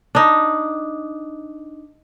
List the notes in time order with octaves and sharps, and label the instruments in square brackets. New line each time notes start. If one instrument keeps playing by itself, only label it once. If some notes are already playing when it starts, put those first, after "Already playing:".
[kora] D4 D#4